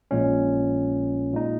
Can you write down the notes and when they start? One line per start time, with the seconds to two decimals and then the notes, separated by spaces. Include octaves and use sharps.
0.11 A#1 A#2 G#3 C#4
1.33 A#2 G#3 D#4